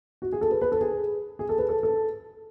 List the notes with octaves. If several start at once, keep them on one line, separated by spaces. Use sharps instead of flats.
F#4
G#4
A4
B4
B4
A4
G#4
G#4
A4
B4
A4
A4